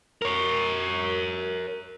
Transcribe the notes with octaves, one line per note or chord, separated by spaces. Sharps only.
A#4 C#5